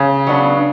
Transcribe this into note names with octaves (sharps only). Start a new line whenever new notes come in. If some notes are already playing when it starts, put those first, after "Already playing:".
Already playing: C#3
F#3 B3 D4